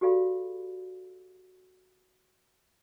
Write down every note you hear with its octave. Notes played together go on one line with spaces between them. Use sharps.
F#4 G4 A4 D5 F5 B5